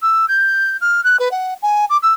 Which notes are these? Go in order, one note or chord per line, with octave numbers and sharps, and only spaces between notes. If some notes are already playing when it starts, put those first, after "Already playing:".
E6
G6
F6
F#6
B4
F#5
G#5
D6
E6